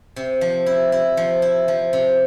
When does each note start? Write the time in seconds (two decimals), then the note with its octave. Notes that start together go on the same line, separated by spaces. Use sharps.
0.16 C3
0.41 F3
0.66 E4
0.92 E4
1.17 F3
1.42 E4
1.68 F3
1.93 C3